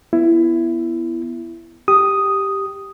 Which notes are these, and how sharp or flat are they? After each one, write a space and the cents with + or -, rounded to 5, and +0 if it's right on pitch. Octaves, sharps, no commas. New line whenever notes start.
B3 +0 E4 +20
G4 +0 D#6 +0